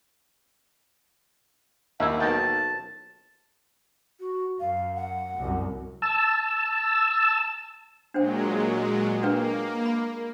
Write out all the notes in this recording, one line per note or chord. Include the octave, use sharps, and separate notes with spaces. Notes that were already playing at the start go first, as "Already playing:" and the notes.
D#2 E4 E5 F#5
B1 D#3 G5 A5
F#4
F#2 F5
F#5
C2 F#2
A5 E6
A#2 F#3 G#3 D4 C5 G5
A#3 D4 B4 G5
B5